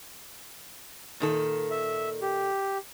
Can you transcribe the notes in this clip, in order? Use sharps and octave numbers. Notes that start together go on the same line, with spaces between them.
A#2 D#3 A4
E5
G4